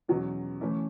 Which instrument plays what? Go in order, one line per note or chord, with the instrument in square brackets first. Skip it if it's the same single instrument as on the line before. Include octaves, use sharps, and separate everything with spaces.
[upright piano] E2 B2 F#3 C#4
E3 A3 C#4 E4